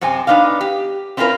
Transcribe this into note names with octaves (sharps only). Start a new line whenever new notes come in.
F#2 C3 C4 G#5
B3 C4 D4 D#4 F5
G4
C4 C#4 E4 F4 A#4 B4